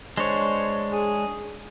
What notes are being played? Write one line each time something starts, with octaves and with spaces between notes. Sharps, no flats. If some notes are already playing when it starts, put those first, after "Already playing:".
G#3 D4 C5 C#5
G#4